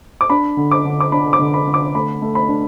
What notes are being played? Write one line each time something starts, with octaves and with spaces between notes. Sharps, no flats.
D6
D4 B5
D3
D6
D3
D6
D4 B5
D6
D3
B5
D3
D6
A3 B5
A3
B5
D4